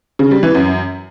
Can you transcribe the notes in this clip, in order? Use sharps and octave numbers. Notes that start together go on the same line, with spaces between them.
C#3
G3
E3
F#2